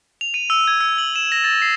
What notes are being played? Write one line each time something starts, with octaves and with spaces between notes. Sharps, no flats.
F7
D#7
E6
G#6
E6
F#7
E7
A#6
A6
C7